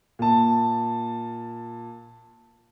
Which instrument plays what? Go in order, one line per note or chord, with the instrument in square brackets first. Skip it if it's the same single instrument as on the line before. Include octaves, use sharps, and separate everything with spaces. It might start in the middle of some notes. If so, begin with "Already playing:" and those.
[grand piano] A#2 A5